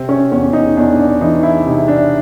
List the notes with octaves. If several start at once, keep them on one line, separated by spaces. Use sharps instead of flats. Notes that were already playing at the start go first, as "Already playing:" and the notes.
Already playing: C3 C4
C#4
E2 C#4
D#4
E2 D4
D4
E3 D#4
E4
C3 D#4
D4